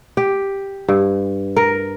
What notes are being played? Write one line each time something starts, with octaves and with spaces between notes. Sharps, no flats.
G4
G2
A#4